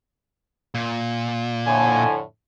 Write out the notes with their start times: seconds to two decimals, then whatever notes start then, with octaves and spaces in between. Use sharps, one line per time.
0.75 A#2
1.67 F2 A2 D3 G#5